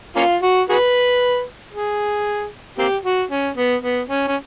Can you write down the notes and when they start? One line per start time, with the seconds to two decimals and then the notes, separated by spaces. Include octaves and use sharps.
0.16 A#3 C#4 F4
0.43 F#4
0.69 F#4 G#4 B4
1.74 G#4
2.78 A#3 C4 G4
3.05 F#4
3.31 C#4
3.57 B3
3.82 B3
4.09 C#4
4.28 C#4